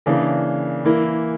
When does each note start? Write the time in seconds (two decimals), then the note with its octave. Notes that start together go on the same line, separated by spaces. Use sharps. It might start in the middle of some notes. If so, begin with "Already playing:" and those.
0.06 C#3 E3 A#3 D4 A#4
0.85 E3 A#3 E4 A#4